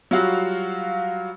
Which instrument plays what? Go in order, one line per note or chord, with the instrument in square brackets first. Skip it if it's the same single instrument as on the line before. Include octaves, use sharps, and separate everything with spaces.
[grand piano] F#3 G3 F4 F#4 F5